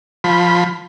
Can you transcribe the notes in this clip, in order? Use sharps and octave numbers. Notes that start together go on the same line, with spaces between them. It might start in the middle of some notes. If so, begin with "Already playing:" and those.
F3 B5